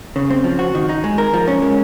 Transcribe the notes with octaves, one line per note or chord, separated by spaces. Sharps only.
C#3
C4
F3
F#4
D#3
D#4
G#3
A#4
F3
C#4
G#3